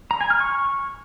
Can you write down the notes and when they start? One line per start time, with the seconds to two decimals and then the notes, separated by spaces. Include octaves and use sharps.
0.11 A#5
0.21 G#5
0.30 F6
0.40 C#6